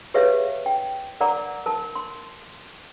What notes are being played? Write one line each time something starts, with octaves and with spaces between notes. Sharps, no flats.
G4 G#4 B4 C#5 E5 F5
G5
A#4 D5 F#5 A#5 D6
A#4 A5
C6